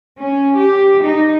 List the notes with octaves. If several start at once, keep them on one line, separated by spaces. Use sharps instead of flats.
C#4
G4
D#4